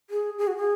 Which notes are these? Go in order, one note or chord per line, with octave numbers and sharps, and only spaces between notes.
G#4
G#4
F#4
G#4